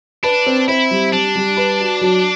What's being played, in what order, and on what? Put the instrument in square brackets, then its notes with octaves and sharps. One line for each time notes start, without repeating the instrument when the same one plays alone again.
[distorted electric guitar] D4 [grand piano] B4
[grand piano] C4
[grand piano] C4 [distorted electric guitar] E4
[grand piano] G3
[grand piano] G3 [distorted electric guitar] D4
[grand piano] G3
B4
F#4
F#3